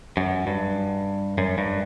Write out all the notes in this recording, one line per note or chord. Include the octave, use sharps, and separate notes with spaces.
F#2
G2
F#2
G2